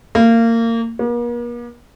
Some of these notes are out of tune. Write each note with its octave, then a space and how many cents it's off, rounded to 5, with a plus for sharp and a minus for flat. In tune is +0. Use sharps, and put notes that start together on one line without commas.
A#3 -25
A#3 +45